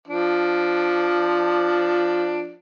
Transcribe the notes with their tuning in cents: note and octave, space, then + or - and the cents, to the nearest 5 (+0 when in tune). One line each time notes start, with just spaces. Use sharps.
F3 +0 D4 +5